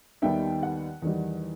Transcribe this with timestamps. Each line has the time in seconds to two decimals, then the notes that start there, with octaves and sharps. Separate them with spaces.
0.22 D#2 D#3 G3 B3 D#4 E5 G5
0.63 F#5
1.02 E2 D#3 G3